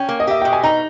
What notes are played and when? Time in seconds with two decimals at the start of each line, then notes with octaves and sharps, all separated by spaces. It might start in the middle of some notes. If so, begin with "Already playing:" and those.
Already playing: C#4 G5
0.09 A#3
0.20 D#5
0.27 G4 E5
0.42 B2 G5
0.53 G#5
0.63 D#4 A#5